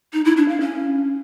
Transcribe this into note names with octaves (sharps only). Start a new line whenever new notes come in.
D#4
E4
D4
F5
C#4